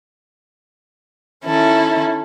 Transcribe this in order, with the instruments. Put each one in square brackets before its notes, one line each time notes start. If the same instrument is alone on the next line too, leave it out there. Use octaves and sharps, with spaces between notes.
[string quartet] D#3 C#4 E4 A4